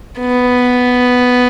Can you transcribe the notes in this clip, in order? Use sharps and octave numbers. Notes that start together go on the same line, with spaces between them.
B3